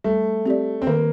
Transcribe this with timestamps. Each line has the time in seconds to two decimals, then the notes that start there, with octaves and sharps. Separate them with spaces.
0.04 G3 A3
0.46 C4 G4 D5
0.82 C4
0.87 D#3 A#3